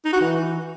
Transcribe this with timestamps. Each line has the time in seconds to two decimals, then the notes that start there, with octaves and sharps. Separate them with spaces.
0.05 D#4
0.13 F#4
0.20 E3